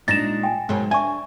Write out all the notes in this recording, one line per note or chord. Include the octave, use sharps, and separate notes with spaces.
A#2 G#3 D4 D#4 A6 A#6 E7
G5 G#5
G#2 B2 F#3 A#3
D4 E5 G#5 C#6